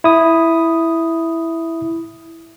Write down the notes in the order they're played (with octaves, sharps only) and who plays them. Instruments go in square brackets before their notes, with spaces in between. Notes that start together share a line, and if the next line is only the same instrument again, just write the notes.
[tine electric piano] E4 D#6